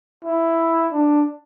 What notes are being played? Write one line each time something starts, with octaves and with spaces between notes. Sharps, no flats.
E4
D4